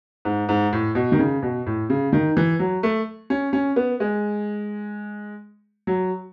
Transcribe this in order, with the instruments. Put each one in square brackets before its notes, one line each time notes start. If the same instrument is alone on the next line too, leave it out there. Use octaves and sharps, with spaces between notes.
[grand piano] G#2
G#2
A2
B2
D#3
C#3
B2
A2
C#3
D#3
E3
F#3
A3
C#4
C#4
B3
G#3
F#3